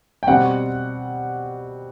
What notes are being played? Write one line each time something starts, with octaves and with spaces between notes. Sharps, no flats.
G5
B2 G3 C4 F#5